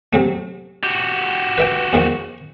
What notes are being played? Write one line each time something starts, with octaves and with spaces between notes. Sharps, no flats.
C3 F#3 A3
F#4 G4
B4 E5 G5
E2 D#3 F3